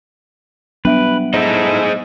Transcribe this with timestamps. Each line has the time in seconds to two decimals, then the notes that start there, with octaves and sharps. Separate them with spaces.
0.85 F#3 G3 B3 D4 B4 E5 D7
1.34 D#4 E4 G#4 A4 C5 D#5